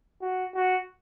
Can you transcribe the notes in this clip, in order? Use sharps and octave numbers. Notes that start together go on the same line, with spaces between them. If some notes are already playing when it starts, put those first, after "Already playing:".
F#4
F#4